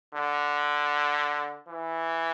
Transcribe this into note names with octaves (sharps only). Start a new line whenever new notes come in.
D3
E3